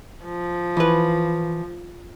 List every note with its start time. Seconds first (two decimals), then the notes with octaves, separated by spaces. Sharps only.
0.25 F3
0.77 E3 B4